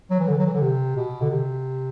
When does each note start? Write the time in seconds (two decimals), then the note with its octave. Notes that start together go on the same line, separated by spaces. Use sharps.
0.11 F#3
0.20 E3
0.28 D3
0.38 F#3
0.46 E3
0.54 D3
0.62 C3
0.96 B2
1.22 D3
1.30 C3